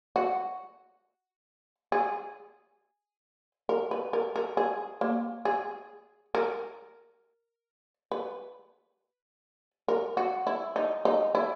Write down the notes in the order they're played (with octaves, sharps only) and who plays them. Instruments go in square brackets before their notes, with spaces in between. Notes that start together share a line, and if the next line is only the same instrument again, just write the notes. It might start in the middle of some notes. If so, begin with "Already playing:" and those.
[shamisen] F#4
G#4
A#4
B4
A#4
A#4
G#4
A#3
G#4
A#4
B4
A#4
F#4
E4
D#4
D#4
E4